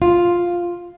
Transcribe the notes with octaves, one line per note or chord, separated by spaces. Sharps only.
F4